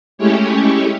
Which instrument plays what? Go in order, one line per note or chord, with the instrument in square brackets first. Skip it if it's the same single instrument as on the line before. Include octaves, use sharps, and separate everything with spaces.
[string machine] G#3 A3 C#4 E4 G4 C#5